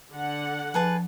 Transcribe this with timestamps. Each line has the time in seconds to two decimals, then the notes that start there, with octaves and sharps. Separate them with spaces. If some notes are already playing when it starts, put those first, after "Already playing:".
0.12 D3 F#5
0.74 F3 G#4 B4 A5